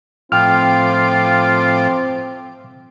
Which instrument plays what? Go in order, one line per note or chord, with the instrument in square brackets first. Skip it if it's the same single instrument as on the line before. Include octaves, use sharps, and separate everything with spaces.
[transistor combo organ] A2 F3 D6 [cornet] C4 [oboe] F4 [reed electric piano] G5 F6